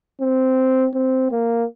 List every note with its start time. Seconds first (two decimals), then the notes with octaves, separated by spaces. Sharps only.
0.21 C4
0.94 C4
1.31 A#3